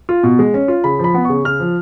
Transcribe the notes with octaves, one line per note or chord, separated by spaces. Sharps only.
F4
B2
G#3
C#4
F4
C#3 B5
F3 B5
B3
C#3 C#6
C#3 F6
F3